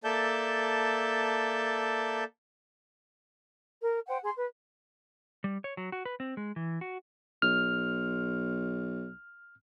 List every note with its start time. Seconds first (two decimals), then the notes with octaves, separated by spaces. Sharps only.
0.04 A#3 A4 D5 E5 A5 G6
3.82 A#4
4.08 C5 F#5 G5
4.23 G#4 C6
4.36 B4
5.44 G3
5.64 C#5
5.77 F#3
5.92 F#4
6.05 B4
6.20 C4
6.37 G#3
6.56 E3
6.81 F#4
7.42 B1 F6